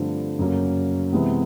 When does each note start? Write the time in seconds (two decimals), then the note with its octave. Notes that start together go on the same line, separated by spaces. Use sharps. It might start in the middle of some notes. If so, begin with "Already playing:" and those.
Already playing: G2 D3 F3 A3 C4
0.39 F#2 C#3 F#3 A#3 C#4
1.13 C3 E3 G#3 B3